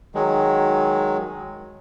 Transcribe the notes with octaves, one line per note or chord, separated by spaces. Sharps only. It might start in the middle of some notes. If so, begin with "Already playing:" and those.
D#3 F#3 G#3